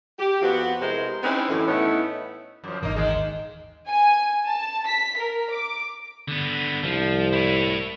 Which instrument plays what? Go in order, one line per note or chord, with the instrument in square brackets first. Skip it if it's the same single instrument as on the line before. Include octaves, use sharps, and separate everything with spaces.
[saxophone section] G4
F2 B3 C4 F#4
C3 G#3 E4 A#4 C5
C4 C#4 D#4 E4 B4
F#2 A2 E3
A2 A3 B3 C#4 D#4 E4
[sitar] F#2 F3
[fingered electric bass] D#1 G#1 E3 [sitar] A#3 D#4
[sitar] D#3 G#3
[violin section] G#5
A5
B6
A#4
D6
[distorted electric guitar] D3 B3
[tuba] C2 [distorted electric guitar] F3
[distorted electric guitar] E4 C#5